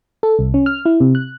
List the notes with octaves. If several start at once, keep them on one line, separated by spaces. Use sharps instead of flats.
A4
C2
C#4
F6
E4
C3
F#6